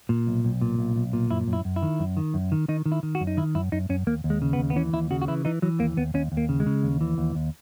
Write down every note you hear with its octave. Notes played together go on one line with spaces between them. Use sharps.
A#2
B1
B1
A#2
B1
B1
A#2
F#2 E4
F#2
E4
F#2
E4
D#3
F#2
D#3
F#2
D#3
D#3 D#4
D#3
E4
D#3
F#4
F#2
D#4
D#3 E4
F#2 E4
F#2 D#4
F#2 C#4
D#2 A#3
D#2
G#3
C#3
B3
D#2
B3
E3 C#4
D#2 E4
C#3 F#4
F#4
E3 E4
E3 D#4
E3 F#3
D#2 A#3
D#2 B3
D#2 C#4
D#2
A#3
C#3
G#3
C#3
D#2
E3
D#2
D#2